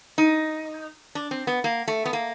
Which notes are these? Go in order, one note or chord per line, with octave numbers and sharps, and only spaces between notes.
D#4
D4
C4
B3
A#3
A3
B3
A#3